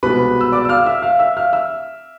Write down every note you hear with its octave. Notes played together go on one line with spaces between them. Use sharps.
C2 B2 G#3 B4 B5
E6
D5 D6
E6
F5 F6
E5 E6
F5 F6
E5 E6
F5 F6
E5 E6